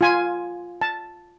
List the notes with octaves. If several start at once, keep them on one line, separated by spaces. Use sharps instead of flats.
F4 G#5
A5